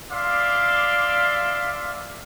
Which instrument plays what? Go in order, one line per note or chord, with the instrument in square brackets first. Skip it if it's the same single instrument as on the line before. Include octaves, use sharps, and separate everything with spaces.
[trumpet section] D5 E5 F5 C6 D6